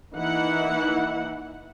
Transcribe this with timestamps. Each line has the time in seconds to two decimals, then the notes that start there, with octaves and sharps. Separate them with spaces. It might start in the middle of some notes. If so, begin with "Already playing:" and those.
0.15 E3 A#3 D#4 E4 F#5